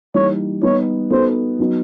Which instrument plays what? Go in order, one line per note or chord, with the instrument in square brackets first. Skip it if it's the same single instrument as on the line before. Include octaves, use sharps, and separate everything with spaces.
[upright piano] E3 G3 A#3 D#4 [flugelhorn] C#5
[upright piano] G3 B3 D#4 [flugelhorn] C#5
[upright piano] B3 D#4 F#4 A4 [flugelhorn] C5
[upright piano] F#3 B3 D#4